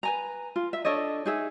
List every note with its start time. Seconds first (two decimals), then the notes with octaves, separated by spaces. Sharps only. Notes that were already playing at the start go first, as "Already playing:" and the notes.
0.03 B4 G#5 A#5
0.56 F4
0.73 E5
0.85 D4 A4 C#5 D#5
1.26 D#4 G#4 E5